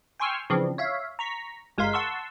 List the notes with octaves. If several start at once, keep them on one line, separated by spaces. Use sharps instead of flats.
G5 G#5 C6 C#6 E6 F6
C#3 E3 F3 C4 D4
C#5 E5 F5
A#5 C#6 B6
G1 G#3 A#4 F5 C6 B6
F#5 A5 C6 C#6 E6